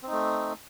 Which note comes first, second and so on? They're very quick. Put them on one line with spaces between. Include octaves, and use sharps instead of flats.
C4 D#4 A3